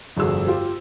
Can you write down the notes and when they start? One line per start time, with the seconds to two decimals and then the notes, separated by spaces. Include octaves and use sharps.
0.17 F1 G2 D3 F#4 G#4 E6
0.46 F4 G4 C5